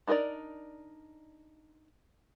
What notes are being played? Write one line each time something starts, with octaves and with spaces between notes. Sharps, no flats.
D4 D#4 A#4 B4 D5